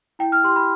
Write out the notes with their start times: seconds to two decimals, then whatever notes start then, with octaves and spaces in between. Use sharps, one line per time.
0.19 E4 G5
0.32 F6
0.44 G4 C6
0.56 B5